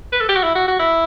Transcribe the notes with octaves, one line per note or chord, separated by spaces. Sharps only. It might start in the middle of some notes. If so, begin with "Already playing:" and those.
B4
A4
G4
F#4
E4
F#4
F#4
E4